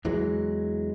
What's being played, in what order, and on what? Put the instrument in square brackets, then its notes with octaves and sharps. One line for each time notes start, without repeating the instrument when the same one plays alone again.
[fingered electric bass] E2 E3 F#3 G#3